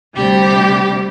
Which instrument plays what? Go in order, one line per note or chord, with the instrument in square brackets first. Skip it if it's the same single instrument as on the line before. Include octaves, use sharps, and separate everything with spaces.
[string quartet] D2 C3 G3 G4